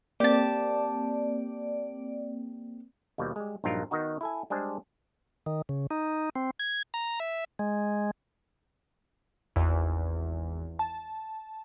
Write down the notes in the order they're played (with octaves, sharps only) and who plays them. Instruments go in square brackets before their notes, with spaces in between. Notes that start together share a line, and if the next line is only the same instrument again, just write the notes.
[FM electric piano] A#3 C4 [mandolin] G4 A5 [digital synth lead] D5
[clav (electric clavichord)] D#2 B2 F3 G3 A#3
G3 G#3
A#1 G2 F#3 D#4 F4 A#4
D#3 B3 D#4 F#4
E4 A4 G#5
G3 G#3 D4 G#4 C5
[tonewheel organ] D#3
C#3
D#4
C4
G#6
A#5
E5
G#3
[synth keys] G#1 E2 E3
A5